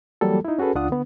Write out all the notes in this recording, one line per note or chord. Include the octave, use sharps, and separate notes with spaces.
E3 F#3 G3 A#3 A4
D#4 E4
C#4 F#4 G#4 A4 B4
C#2 D4 F4 F#5 D#6
D3 B3